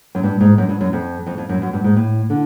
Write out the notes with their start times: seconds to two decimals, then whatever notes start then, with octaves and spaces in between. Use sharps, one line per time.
0.15 F#2
0.23 G2
0.40 G#2
0.58 F#2
0.69 G2
0.81 F#2
0.93 F2
1.26 F2
1.38 F2
1.49 F#2
1.62 F#2
1.73 G2
1.84 G#2
1.96 A2
2.30 D3